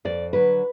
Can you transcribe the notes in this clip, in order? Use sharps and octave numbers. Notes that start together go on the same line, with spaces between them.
F2 D5
D3 F#3 B4